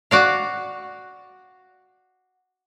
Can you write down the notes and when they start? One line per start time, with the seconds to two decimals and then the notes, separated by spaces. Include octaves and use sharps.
0.11 F#4 D5 F5